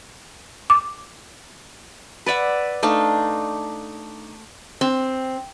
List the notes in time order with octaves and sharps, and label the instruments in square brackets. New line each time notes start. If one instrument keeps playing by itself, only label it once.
[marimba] D6
[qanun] B4 D5 E5 F#5
A3 D4 D#4 F5
[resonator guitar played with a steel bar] C4